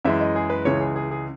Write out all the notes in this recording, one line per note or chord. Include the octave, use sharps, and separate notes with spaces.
F#2 E3 G#3 E5
D#5
G#4
B4
C#2 C#3 E3 G#3 C#5
G#4
G#4
G#4